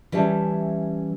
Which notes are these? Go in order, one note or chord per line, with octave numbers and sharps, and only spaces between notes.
E3 G3 C#4 E5 A5